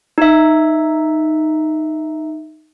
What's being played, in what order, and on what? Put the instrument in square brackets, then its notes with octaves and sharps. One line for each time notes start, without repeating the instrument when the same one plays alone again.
[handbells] D#4 E5